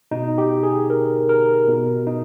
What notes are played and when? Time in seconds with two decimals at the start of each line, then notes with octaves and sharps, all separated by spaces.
0.11 B2 D#4
0.38 G4
0.63 G#4
0.90 A#4
1.29 A#4
1.68 B2
2.07 D#4